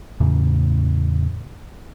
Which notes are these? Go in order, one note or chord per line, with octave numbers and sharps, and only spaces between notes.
E2 A2 C#3